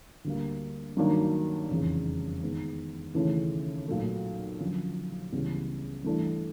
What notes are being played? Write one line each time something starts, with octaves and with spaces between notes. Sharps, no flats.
D2 D3 G3 A#3
G2 D#3 F#3 A#3 D4
F1 E2 C#3
D#3 G#3 B3
D#2 C#3 E3 A3 C#4
B1 A#2 F#3 A3
F#2 D3 F3
C#2 C#3 E3 G3 B3
G2 E3 A3 D4